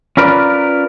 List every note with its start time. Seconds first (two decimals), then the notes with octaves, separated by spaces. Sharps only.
0.17 C#4 F4 A#4 B4 D5